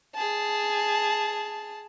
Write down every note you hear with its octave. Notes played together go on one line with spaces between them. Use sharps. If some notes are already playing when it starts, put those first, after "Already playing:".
G#4 A5